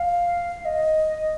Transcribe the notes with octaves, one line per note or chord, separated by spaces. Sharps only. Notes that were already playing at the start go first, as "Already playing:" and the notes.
Already playing: F5
D#5